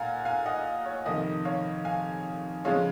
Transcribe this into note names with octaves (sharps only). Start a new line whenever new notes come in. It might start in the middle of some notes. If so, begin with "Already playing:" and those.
Already playing: A#2 F5 F#5 G#5 A#5
F5 G#5
D#5 F#5
C#5
F2 C3 D#3 D#5
C#5 F5
F5 G#5
C#3 F3 G#3 C#5 F5